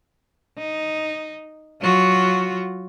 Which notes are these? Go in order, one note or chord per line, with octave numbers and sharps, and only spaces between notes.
D#4
F#3 F4 F#4